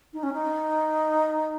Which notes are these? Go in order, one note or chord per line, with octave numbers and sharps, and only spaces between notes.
D#4
C#4
D#4